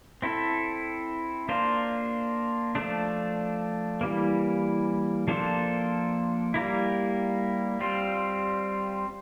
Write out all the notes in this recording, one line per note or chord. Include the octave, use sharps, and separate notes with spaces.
C4 E4 A4
A#3 D4 F4 C5
F3 A3 D4
E3 G3 A#3
F3 A#3 D4 A4 C5
G3 A#3 E4
G3 C4 F4